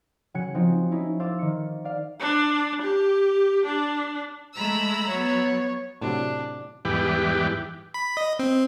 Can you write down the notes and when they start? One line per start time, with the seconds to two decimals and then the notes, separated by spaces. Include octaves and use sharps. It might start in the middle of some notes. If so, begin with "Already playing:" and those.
0.34 C#3 F#3 G#5 F#6 C#7
0.54 F3 C4 D#4 F#4
0.91 C#4 D#4 E4
1.20 C5 F5 D6 E6 A6
1.39 D#3 C#7
1.84 D5 F5
2.20 D4
2.82 G4
3.66 D4
4.56 G#3 A3 A#5 B5 E6
5.08 F#3 B3 C#5
6.01 A2 C3 F#3 D4
6.85 E2 G#2 E3 G3 G4 B4
7.94 B5
8.17 D#5
8.39 C4